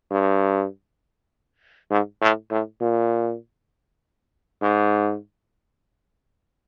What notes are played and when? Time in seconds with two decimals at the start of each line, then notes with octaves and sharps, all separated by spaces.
0.11 G2
1.91 G#2
2.22 A2
2.51 A2
2.81 A#2
4.62 G#2